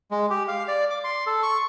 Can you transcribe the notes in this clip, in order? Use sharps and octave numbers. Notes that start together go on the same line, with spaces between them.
G#3
G4
F5
D5
D6
C6
A4
C#6